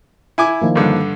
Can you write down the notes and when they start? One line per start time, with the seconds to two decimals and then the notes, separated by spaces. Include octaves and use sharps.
0.38 E4 G#5 D6
0.61 D#3 F3 A#3
0.76 G2 D3